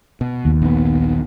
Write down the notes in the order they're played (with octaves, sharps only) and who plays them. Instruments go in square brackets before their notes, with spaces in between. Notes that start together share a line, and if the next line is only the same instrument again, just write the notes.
[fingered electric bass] B2
[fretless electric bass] D#2
[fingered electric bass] A#1 B3